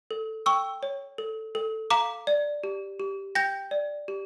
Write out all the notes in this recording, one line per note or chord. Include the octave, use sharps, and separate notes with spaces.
A4
G5 C#6 E6
C#5
A4
A4
F5 A#5 D6
D5
G4
G4
G5 G6 A#6
D5
G4